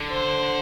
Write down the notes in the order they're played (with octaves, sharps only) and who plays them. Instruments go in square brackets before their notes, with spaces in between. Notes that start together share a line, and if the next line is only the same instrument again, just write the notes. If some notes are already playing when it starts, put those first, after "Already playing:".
Already playing: [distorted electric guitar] D3
[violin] C5